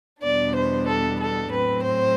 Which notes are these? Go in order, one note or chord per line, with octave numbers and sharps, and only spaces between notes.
E2 B2 G3 B3 D4 D5
C5
A4
A4
A2 F#3 C4 B4
C5